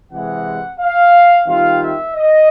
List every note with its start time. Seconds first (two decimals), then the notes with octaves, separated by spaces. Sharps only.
0.12 C3 E3 G#3 F#5
0.80 F5
1.47 D#3 G3 C4 F4 F5
1.81 E5
2.15 D#5